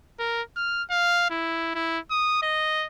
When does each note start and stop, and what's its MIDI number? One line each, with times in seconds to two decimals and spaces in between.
0.19 0.42 70
0.56 0.83 89
0.90 1.27 77
1.30 1.71 64
1.75 1.99 64
2.11 2.42 87
2.43 2.86 75